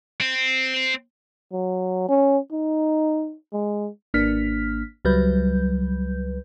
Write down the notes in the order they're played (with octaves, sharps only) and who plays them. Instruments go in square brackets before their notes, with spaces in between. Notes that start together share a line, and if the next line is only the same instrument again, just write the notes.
[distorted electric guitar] C4
[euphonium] F#3
C#4
D#4
G#3
[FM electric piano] G#1 A#3 D4 F6 B6
C#2 F#3 G3 B4 G6